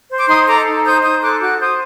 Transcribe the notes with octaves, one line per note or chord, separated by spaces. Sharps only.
C5
D6
D#4 C6 D#6
A4 A#5 D6
D#4
C5 D#6 G6
D#4 D#6 G6
A4 D6 F#6
F#4 D6 F#6
C5 D#6 G6